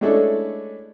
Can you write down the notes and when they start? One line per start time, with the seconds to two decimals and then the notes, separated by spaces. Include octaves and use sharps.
0.01 G#3 A3 C#4 D4 E4 A4